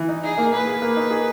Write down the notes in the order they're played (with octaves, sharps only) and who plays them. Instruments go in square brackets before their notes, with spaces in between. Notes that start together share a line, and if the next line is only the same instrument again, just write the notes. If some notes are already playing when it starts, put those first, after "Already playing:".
Already playing: [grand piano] E3
D#4
[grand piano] D#4 [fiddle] G#4
[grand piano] A#3
[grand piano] A#3 [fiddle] B4
[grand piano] G#4
A#3
D#4
G#4